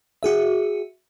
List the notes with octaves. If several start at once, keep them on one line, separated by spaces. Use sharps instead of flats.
F#4 G#4 E5